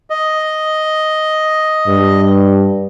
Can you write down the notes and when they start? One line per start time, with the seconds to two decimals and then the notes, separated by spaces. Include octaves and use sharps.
0.10 D#5
1.88 G2